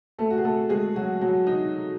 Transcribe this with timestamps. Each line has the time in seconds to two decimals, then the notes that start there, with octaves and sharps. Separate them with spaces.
0.19 A3 A4
0.30 F#4
0.38 G#4
0.44 A3 A4
0.69 G#3 G#4
0.96 F#3 F#4
1.21 F#3 F#4
1.47 D#4